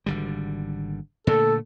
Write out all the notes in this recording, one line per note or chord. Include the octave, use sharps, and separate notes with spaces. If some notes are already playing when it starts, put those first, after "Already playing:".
G#1 D3 G3
A#2 D3 A3 A4